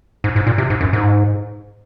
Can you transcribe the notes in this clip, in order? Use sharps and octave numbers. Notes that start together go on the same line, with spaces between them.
G#2
G#2
A#2
C3
G#2
F#2
G#2